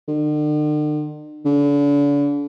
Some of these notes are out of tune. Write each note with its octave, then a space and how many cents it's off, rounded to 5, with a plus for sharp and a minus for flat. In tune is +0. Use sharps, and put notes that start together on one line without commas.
D3 +45
D3 -40